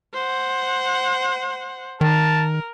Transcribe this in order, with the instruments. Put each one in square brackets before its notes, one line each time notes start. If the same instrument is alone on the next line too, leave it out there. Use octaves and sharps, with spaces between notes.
[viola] C5 F#5
[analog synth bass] D#3 [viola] A#4 [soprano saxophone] A5